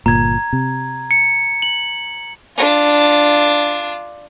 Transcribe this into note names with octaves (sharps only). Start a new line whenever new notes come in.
G1 A#2 A#5 G#6
C3
C#7
F#7
D4 F4